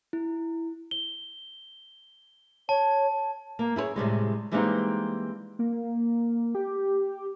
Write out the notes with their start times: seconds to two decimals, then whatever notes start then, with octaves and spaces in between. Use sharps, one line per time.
0.13 E4
0.91 G7
2.69 C#5 A5
3.59 A#3
3.76 E4 G#4 B4 C#5
3.96 A2 C3 G3 G#3
4.51 E3 G3 G#3 A#3 C4 D#4
5.59 A#3
6.55 G4